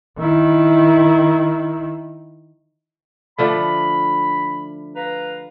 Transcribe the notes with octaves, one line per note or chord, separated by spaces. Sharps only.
D#3 E4
D3 F3 A3 B5
B4 F5 A#5